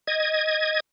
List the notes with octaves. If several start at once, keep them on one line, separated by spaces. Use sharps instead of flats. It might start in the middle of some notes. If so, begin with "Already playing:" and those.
D#5 G#6